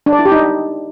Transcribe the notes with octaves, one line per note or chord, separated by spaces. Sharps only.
D4
D5
E4
G4
D#4